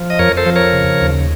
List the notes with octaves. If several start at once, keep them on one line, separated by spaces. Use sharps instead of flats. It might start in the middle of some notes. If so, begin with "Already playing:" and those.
Already playing: F3
D#5
F2 A#4 C#5
A4 C5
F3
A#4 C#5
C#3
D#2